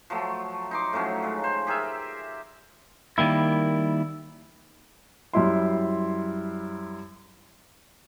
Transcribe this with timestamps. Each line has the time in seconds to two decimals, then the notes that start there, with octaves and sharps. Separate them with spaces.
0.10 F3 F#3 A3
0.71 D#4 C6 D6
0.93 A2 F3 F#3 C#4
1.22 C#3 G#3
1.44 C5
1.67 G4 G#4 A#4 E5
3.18 D#3 G3 A#3 E4
5.33 F#2 G3 E4 C6